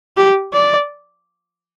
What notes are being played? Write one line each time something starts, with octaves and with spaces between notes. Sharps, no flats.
G4
D5